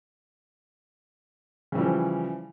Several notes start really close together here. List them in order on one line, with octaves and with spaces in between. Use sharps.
C#3 E3 G3 F3